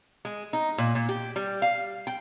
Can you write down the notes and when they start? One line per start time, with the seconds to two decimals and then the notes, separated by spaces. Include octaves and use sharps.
0.25 G#3
0.53 D#4
0.78 A#2
0.95 A#2
1.09 G4
1.36 G3
1.62 F5
2.07 G5